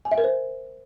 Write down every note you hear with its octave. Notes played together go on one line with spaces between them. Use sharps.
G#5
E5
A#4
C5